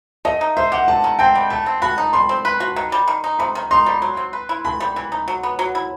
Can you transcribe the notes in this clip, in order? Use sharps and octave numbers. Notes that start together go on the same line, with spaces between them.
A3 D#5
D#4
C5 E5
G4 F#5
C3 A5
D#3
C4 G5
G3
A3 A5
C4
F#4 B5
D#4
G3 C6
C4
B4
F#4
D#3
G3
D#3
D#4
C3 B5
D#3
D#4 C6
G3
F#3
C4
B4
E4
E3 B5
G3
E3
D#4
F#3
B3
F#3
E4